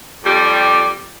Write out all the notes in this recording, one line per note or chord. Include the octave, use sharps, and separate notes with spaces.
F2 G3